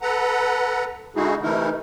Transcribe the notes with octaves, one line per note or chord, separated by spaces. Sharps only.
A4 B4 F#5 A#5
D3 G#3 D#4 E4 F#4 G#4
C3 E3 A3 D#4 E4 A#4